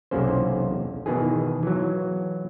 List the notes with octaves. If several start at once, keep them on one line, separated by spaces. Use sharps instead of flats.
B1 E2 C3 A#3 C#4 C5
B2 D#3 E3 G#4
E3 F#3